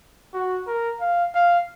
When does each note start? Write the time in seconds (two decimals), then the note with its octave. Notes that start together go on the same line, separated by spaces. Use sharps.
0.34 F#4
0.67 A#4
1.01 F5
1.35 F5